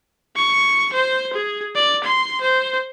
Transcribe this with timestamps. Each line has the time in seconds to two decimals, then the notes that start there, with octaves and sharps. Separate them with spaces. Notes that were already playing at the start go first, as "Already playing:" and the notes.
0.36 C#6
0.93 C5
1.34 G#4
1.75 D5
2.04 C6
2.41 C5